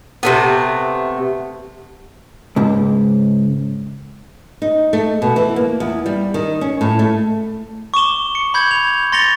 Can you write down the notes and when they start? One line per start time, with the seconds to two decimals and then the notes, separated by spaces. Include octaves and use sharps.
0.23 C3 A3 B3
2.56 C#2 G#2
4.62 D#4
4.93 A3
5.22 B2
5.36 E3
5.56 A#3
5.80 E2
6.06 G3
6.34 D#3
6.61 C#4
6.81 A2
6.99 A3
7.94 C#6 D6 E7 G7
8.35 C#7
8.54 B5 G6 G#6
8.71 F7
9.12 C6 A6 A#6 C#7 F7 G7